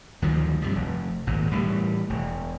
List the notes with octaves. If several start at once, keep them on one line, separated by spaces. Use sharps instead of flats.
D2 D#3 F3 F#3
G2 C3 F3
F1
G#1 A#2
A2 E3 F3 G3
E1